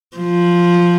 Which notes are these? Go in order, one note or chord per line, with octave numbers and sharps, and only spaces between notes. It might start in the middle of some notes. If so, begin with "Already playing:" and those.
F3